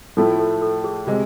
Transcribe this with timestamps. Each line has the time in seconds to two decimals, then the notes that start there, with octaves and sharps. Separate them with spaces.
0.17 A2 F3 A3 E4 A4
0.39 A4
0.62 A4
0.84 G#4
1.07 C3 G#3